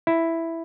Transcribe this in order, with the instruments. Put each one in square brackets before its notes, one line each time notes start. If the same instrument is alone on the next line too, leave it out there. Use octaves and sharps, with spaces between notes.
[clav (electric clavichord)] E4